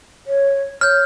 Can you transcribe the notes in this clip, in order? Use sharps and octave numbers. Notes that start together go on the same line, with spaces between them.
C#5
C#5 F6 G6